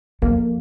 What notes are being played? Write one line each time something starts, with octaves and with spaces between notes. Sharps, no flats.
F2 A#3